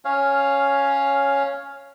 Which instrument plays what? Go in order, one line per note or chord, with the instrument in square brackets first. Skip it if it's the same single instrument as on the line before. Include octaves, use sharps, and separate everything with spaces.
[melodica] C#4 C#5 F5